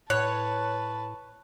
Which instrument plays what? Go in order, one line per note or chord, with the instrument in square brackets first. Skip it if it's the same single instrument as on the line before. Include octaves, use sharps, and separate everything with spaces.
[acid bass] A2 [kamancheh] B4 A5 [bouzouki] C#5 [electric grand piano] F#6